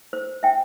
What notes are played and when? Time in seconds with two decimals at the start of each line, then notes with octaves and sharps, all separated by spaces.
0.13 C5
0.43 E5 G5